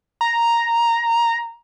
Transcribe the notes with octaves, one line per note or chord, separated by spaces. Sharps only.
A#5